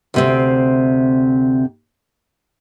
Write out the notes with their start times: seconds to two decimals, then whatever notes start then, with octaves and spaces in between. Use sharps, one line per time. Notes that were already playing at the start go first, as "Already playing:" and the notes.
0.14 D2 C3 C4